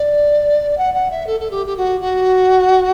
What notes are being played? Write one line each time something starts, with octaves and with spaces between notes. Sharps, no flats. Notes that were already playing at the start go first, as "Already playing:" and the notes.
Already playing: D5
F#5
F#5
E5
A4
A4
G4
G4
F#4
F#4